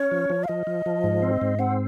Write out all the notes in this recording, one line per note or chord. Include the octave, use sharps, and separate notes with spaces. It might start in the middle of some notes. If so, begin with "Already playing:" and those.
Already playing: C#4 C#5
F3
F3
F5
F3 D#5
F3
F3
G#2
C4
G#2
C4 F#5